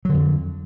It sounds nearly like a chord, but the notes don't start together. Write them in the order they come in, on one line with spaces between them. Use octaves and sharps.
F#3 D3 F2